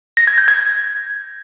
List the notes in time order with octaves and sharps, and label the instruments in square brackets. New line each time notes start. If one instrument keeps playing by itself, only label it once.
[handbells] A#6
G#6
G6
G#6